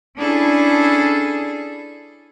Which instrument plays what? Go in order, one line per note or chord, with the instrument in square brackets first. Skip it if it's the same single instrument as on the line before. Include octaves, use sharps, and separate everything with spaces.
[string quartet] C#4 D4 E4 G#4 A4